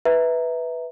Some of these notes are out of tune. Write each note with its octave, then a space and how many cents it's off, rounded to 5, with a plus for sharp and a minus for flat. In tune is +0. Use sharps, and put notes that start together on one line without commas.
B4 +0 E5 -15 A#5 +0